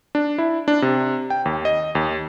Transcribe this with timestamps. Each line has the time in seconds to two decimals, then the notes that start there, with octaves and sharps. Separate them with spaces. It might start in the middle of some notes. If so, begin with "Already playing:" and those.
0.15 D4
0.38 E4
0.68 D4
0.82 C3
1.30 G5
1.45 D#2
1.65 D#5
1.95 D#2